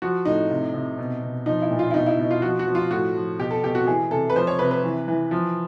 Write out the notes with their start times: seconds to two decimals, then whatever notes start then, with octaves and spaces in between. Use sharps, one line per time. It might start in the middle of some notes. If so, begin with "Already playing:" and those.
0.02 F3 F#4
0.25 A2 D#4
0.50 C3
0.74 C3
0.99 B2
1.22 B2
1.46 F3 D#4
1.62 E4
1.71 A#2
1.79 F4
1.91 E4
1.94 B2 D#4
2.06 E4
2.19 B2
2.31 F4
2.42 F3 F#4
2.59 F#4
2.67 F3
2.75 F4
2.91 A2 F#4
3.15 F3
3.39 B2 G4
3.51 A4
3.63 B2 G4
3.75 F#4
3.87 E3 G#4
4.11 C3 A4
4.30 B4
4.36 F3 C5
4.47 C#5
4.59 C3 B4
4.71 B4
4.84 E3
5.08 E3
5.31 F3